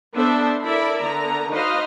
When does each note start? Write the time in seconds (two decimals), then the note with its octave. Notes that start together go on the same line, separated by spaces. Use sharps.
0.15 B3 D4 A4 C5 E5
0.64 E4 A4 A#4 D5 E5 B5
1.03 D3 B3 A#4 A#5
1.51 D#4 F#4 B4 C5 D#5 F5